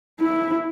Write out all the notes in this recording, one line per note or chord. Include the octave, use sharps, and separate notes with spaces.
E4